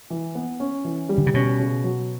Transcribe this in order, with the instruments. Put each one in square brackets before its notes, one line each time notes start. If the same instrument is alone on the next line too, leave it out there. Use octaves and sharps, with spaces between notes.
[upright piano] E3
B3
C#4
E3
G3
[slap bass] D3
C#3
[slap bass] B2 [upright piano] C#4
[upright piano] C#3
F#3